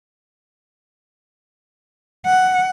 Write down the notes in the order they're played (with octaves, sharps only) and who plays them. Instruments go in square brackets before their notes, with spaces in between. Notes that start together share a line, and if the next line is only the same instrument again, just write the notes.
[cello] F#5